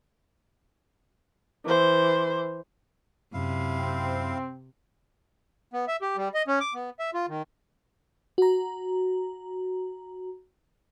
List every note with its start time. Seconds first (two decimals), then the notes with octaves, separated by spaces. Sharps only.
1.65 E3 C5
3.33 F#2 C3 E4 F5
3.77 C4
5.73 B3
5.88 E5
6.02 G4
6.17 G3
6.34 D#5
6.48 C#4
6.60 D6
6.74 B3
7.00 E5
7.14 F4
7.28 D#3
8.38 F#4 A#5